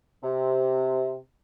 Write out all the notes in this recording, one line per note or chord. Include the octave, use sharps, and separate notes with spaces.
C3